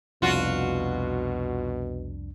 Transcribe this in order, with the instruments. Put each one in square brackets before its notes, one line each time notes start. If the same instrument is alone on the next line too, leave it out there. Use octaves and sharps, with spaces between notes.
[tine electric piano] C2 F2 D4 [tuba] B2 [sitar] F4 F#4